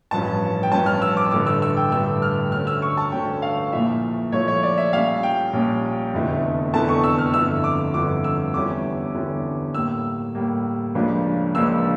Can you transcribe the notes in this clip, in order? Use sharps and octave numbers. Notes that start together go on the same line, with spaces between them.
A1 G2 F3 C#4 A5
G5
A1 G2 F3 C#4 A5
F6
E6
D6
A1 G2 D3 A3 D6
E6
E6
G5
A1 G2 D3 A3 E6
F6
D2 D3 A3 C#4 F6
E6
C#6
A5
D2 D3 A3 C#4 G5
F5
A#1 A#2 F3 A3 E4 E5
A#1 A#2 F3 A3 E4 C#5
C#5
D5
E5
A#1 A#2 G3 C#4 F5
G5
A#1 A#2 G3 C#4
F1 E2 D3 A3 E4
F1 E2 D3 A3 E4 A5
C#6
E6
F6
G1 F2 D3 A3 E4 E6
D6
G1 F2 D3 A3 E4 D6
E6
E2 D3 G3 C#4 E4 D6
E2 D3 G3 C#4 E4
A2 G3 A#3 E6
A2 G3 A#3
C#2 C#3 F3 A#3 D4
C#2 C#3 F3 A#3 D4 E6